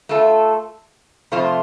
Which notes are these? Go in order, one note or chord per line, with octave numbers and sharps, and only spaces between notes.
A3 F4 A4
F2 C3 A3 F4 C5